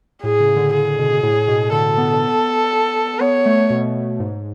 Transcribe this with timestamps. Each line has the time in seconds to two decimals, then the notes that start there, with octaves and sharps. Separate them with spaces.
0.23 A2 G#4
0.40 C#3
0.56 D3
0.73 G#4
0.98 B2
1.23 A2
1.48 B2
1.72 D3 A4
1.98 B3
3.20 B3 C#5
3.46 A3
3.70 B2
4.19 G#2